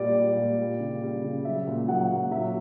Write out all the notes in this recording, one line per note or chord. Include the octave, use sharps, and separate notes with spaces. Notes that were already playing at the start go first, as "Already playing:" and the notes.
Already playing: A#2 G3 D5
G3
A#2
G3
C#3
G3
C#3
F#3 E5
A#2
F#3 F#5
A#2
F#3 E5